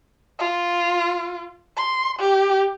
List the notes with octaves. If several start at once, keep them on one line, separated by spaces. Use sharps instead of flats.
F4
C6
G4